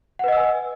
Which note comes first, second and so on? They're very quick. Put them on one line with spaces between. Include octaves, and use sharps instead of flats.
F#5 B4 D#5 E6 G#5